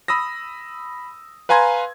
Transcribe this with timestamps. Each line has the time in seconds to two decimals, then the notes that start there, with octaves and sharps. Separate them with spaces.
0.08 B5 D#6 E6 A#6
1.49 B4 F5 G#5 A#5 C6 G#6